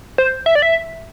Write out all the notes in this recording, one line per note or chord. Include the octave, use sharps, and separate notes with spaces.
C5
E5
D5
E5